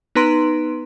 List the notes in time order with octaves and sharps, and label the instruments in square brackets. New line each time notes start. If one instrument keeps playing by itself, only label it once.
[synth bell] B3 D#4 B4 A#5 C6 D7